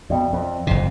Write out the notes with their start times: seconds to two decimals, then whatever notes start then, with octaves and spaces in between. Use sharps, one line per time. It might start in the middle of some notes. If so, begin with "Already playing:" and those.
0.10 F2 B2 D5 E5 G5
0.33 F2
0.67 F#1 F2 C3